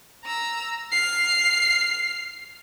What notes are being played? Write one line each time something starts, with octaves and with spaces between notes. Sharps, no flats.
A#5 E6
F6 C7